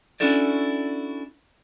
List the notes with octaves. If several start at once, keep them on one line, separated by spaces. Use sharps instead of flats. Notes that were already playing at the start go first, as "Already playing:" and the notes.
C#4 D4 E4 F#4 A4 D5